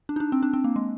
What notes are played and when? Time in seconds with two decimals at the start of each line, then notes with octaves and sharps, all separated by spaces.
0.09 D4
0.16 D#4
0.20 D4
0.32 C4
0.43 D4
0.53 C4
0.64 A#3
0.76 G#3